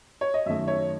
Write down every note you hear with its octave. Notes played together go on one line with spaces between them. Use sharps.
C#5
D#5
F#2 D#3 A3 E5
C#5